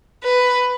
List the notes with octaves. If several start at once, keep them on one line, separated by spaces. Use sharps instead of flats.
B4